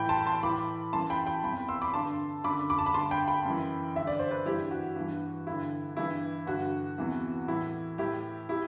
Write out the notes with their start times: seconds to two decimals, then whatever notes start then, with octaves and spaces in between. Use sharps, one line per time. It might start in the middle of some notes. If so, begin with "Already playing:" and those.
Already playing: A2 E3 G5 B5
0.09 A5 C6
0.26 A5 C6
0.43 A2 E3 B5 D6
0.93 F#2 E3 A5 C6
1.10 G5 B5
1.26 G5 B5
1.44 E2 C3 E3 G5 B5
1.69 C6 E6
1.82 B5 D6
1.94 G2 D3 A5 C6
2.44 F#2 D3 B5 D6
2.70 B5 D6
2.79 A5
2.86 B5
2.94 G2 D3 A5 C6
3.11 G5 B5
3.28 G5 B5
3.45 F#2 E3
3.96 G2 D3 E5
4.07 D5
4.19 C5
4.31 B4 D5
4.46 G2 E3 E4 G4
4.71 F#4
4.96 G2 E3
5.47 G2 D3 E4
5.97 G2 E3 E4
6.47 G2 D3 F#4
6.98 E2 C3 E3
7.48 A2 E3 E4
7.98 A2 E3 E4 G4
8.49 E4 G4